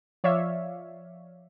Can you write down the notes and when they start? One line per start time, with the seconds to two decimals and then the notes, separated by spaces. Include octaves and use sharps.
0.24 F3 C#5 D5 E5 F5